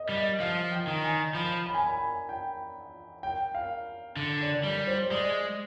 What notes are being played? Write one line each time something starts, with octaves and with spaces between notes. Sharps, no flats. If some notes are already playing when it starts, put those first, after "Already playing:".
Already playing: D#5
G3
D#5
F3 F5
G5
D#3
G#5
F3 B5
B5
G#5
B5
G#5
G5
G5
F5
D3
D5
G3 D5
C5
G#3 D5